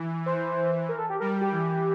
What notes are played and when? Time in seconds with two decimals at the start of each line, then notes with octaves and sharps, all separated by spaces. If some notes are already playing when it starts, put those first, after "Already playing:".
Already playing: E3
0.26 E3 C5
0.89 A#4
0.99 A4
1.09 G4
1.20 G3 A#4
1.41 G4
1.52 E3